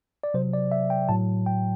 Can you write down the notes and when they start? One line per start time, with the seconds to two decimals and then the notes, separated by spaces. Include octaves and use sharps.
0.24 D5
0.34 C3 F#3 C5
0.53 D5
0.72 E5
0.90 G5
1.09 A2 F#3 A5
1.46 G5